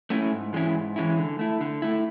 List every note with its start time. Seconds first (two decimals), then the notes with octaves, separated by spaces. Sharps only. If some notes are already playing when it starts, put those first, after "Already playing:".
0.10 A3 C#4 E4
0.32 G#2
0.53 E3 G#3 C#4 E4
0.75 G#2
0.96 E3 G#3 C#4 E4
1.17 D3
1.39 A3 E4
1.61 D3
1.82 A3 E4